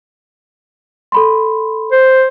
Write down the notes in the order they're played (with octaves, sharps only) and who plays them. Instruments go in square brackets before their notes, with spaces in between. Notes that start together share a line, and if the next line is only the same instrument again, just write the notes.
[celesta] A4 B5 C6
[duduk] C5